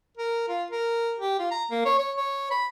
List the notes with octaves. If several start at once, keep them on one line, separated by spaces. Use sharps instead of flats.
A#4
F4
A#4
G4
F4
A#5
A#3
C#5
C#5
C#5
B5